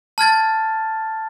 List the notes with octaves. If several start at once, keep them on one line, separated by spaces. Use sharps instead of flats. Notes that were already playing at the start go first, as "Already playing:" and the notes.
A5 F6 G#6 A6